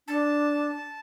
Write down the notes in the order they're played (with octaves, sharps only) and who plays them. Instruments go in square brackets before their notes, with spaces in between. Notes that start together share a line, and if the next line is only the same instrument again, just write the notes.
[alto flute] D4 [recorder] A5